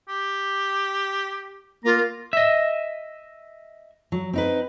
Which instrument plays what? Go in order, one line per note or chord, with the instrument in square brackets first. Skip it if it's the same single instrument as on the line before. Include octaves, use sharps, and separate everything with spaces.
[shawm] G4
[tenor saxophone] A#3 [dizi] F4 [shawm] A#5
[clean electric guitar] D#5 E5
[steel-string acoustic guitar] F#3
C4 D#4 B4